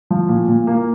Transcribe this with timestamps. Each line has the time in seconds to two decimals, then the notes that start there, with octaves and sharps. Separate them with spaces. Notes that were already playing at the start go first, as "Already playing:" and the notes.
0.11 F3
0.29 A#2
0.48 A#2
0.67 A#3